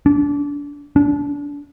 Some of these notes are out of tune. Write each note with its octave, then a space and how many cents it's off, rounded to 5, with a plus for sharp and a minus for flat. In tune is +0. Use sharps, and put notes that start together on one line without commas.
D4 -30
D4 -30